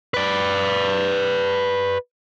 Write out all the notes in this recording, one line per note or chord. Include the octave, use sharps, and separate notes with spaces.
B4 D5